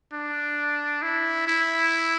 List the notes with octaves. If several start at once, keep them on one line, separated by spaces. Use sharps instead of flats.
D4
E4
E4